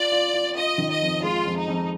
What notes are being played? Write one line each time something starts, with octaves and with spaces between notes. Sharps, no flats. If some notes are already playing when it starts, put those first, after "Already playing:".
Already playing: F4 D5
F4
F4
F4 D#5
D#3
D#5
F2
G#3 F4
F2
D#4
F2